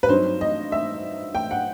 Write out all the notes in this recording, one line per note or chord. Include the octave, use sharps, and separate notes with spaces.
B4
G2 F#3 C4 D#4 C5
D#5
E5
G5
F#5